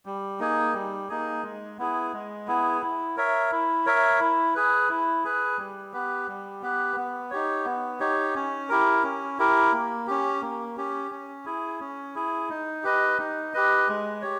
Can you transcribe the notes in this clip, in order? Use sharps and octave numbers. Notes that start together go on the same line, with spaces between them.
G3
A#3 D#4 G#4
G3
A#3 D#4 G#4
G#3
B3 E4 G#4
G#3
B3 E4 G#4
E4
A#4 C#5 E5
E4
A#4 C#5 E5
E4
G#4 B4
E4
G#4 B4
G3
B3 G4 B4
G3
B3 G4 B4
B3
D#4 G4 C#5
B3
D#4 G4 C#5
C#4
E4 G4 A#4
C#4
E4 G4 A#4
A#3
C#4 G4
A#3
C#4 G4
C#4
E4 G#4
C#4
E4 G#4
D#4
G4 B4 D#5
D#4
G4 B4 D#5
G#3
G4 C#5